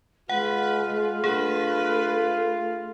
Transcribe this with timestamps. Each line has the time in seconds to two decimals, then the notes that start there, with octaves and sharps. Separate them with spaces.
0.29 G#3 F4 B4 F#5
1.24 A3 D4 G#4 B4